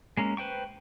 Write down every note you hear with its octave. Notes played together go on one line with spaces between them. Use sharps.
G#3 A#3 C#4
B4 C5 G5 C#6